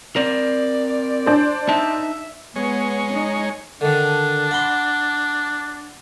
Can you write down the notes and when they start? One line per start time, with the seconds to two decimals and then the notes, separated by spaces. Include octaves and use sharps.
0.16 C4 A#4 D5
1.26 D4 C5
1.69 D#4 E5 A5
2.56 G#3 B3 C#5
3.13 D#4
3.81 D3 D#3 D4
4.51 F#5 B5 C6